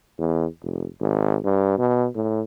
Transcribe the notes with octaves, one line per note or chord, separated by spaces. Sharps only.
E2
F1
G#1
G2
B2
A2